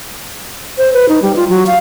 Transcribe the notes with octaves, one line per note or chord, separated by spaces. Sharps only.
C5
B4
D#4
G3
F4
F#3
F5